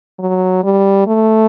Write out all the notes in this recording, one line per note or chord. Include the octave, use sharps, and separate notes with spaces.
F#3
G3
A3